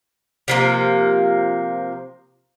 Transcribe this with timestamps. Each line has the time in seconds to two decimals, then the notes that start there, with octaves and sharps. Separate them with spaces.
0.48 C3 F3 A#3